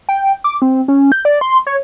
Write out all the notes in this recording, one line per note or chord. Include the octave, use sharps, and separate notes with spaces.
G5
D6
C4
C#4
G6
D5
C6
C#5